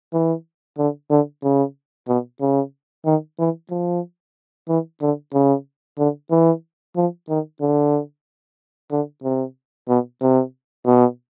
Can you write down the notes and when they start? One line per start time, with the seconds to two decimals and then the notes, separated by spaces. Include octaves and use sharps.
0.13 E3
0.78 D3
1.10 D3
1.43 C#3
2.08 B2
2.41 C#3
3.05 D#3
3.39 E3
3.70 F3
4.68 E3
5.01 D3
5.34 C#3
5.98 D3
6.31 E3
6.96 F3
7.29 D#3
7.61 D3
8.91 D3
9.24 C3
9.88 B2
10.22 C3
10.86 B2